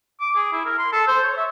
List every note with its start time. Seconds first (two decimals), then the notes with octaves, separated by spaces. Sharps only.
0.21 D6
0.36 G#4
0.52 E4
0.65 A#4
0.79 C6
0.93 A4
1.07 C5
1.23 C#5
1.37 E5